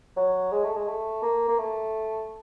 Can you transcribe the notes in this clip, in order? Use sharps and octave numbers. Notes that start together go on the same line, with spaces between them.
F#3
G#3
A3
G#3
A3
A#3
A#3
A3